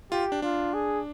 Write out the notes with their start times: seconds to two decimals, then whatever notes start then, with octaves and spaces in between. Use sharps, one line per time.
0.12 F4 G4
0.32 D4
0.42 D4 F4
0.74 G#4